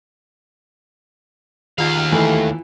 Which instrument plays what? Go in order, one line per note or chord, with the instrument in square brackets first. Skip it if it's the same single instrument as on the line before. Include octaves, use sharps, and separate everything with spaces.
[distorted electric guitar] D#2 F5 [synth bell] D#3 F4
[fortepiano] E3 [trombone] A3